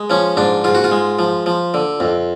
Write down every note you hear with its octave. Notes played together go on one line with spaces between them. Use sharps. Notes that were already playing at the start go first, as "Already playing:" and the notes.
Already playing: G#3
F3 C#4
G#2 D4
G#2 F4
F#4
F4
G#3
F3
F3
D3
F2